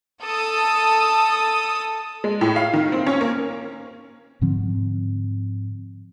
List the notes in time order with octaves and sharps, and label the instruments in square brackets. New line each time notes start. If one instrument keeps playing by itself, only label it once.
[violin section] A4 D#6
[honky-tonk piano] G#3
A2
F5
D#3
C4
C#4
A#3
[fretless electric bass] G#2 D3 F3 C4